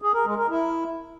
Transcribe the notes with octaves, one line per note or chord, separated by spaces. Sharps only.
G#4
A#4
G#3
A#4
E4